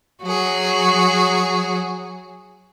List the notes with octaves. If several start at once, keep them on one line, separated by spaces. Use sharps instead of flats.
F#3 F#4 G#4